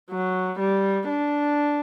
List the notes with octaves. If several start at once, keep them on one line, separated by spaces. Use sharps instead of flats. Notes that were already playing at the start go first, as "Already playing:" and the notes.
F#3
G3
D4